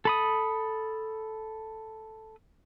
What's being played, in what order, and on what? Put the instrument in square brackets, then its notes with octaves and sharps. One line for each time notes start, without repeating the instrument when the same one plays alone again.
[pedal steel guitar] A4 B5 D#6